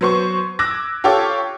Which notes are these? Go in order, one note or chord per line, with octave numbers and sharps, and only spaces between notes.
F#3 B3 C5 C6 C#6
D6 E6 F#6 G#6 A#6
F4 G4 A4 C#5 C#6 D6